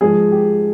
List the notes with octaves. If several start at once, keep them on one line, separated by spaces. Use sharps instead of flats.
G#2 F3 G#4
G4